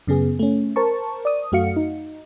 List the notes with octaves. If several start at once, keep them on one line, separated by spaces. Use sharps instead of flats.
F#2 C#3 B3 G#4
A3 C#4
A#4 C5 A5 C#6
D5 D#6
F#2 A3 F#4 F5 C#7
D#4